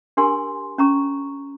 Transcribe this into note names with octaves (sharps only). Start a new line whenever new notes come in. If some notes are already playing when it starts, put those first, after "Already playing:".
D4 G4 A#4 G#5 C6
C#4 A#5 C#6